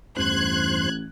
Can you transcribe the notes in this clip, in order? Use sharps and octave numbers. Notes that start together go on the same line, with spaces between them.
A1 E2 G2 C5 F#6 G#6